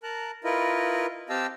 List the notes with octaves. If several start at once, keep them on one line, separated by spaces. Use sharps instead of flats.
A#4 A5 A#5 F#6
E4 F4 A#4 B4 D#5
C4 G4 D#5 F5 A5 E6